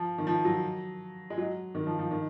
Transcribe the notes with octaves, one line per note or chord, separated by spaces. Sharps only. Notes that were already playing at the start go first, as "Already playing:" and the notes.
Already playing: F3
D#3
F3
F#3
G#3
F#3
D#3
F3
F3
D#3